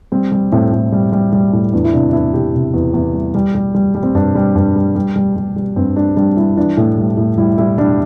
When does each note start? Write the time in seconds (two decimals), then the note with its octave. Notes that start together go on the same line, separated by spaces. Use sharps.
0.12 G3 C4
0.32 G3
0.52 A2 C4
0.72 A2
0.92 G3
1.12 G3
1.33 G3
1.53 A2
1.73 E2 D4
1.84 E4
1.93 C3 D4
2.09 D4
2.13 E2 E4
2.34 C3 G4
2.54 C3
2.74 E2
2.94 E2
3.14 G3
3.34 G3
3.55 G3
3.75 G3
3.95 G3
4.03 C4
4.15 G2 D4
4.35 G3
4.55 G2
4.76 G3
4.95 G3
5.16 G3
5.36 G3
5.56 G3
5.76 G2 C4
5.96 G3 D4
6.16 G3 D4
6.37 G3 E4
6.57 E3 D4
6.77 A2
6.98 G3
7.17 A2
7.38 G3 E4
7.58 G3 E4
7.78 G3 D4